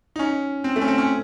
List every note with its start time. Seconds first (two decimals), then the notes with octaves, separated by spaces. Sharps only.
0.16 D#4
0.19 C#4
0.64 C4
0.76 A3
0.81 C#4
0.88 C4
0.98 C#4